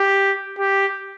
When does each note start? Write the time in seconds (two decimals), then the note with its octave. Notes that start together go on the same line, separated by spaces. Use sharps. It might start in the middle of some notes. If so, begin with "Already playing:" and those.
Already playing: G4
0.58 G4